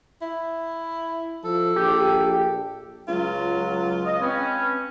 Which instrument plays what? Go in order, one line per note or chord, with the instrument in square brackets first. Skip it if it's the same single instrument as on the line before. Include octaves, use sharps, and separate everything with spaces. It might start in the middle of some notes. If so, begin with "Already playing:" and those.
[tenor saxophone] E4
[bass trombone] F3 [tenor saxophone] A4
[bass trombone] A#1 [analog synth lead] G4
[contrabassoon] C#2 [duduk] F#3 [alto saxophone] F4
[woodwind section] D#5
[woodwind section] C4 C#4 [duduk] B4